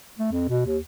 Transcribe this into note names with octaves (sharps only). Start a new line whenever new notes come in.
A3
F2
B2
D#2